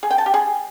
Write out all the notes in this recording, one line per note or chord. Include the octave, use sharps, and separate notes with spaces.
G#4
G5
A5
G4
G#4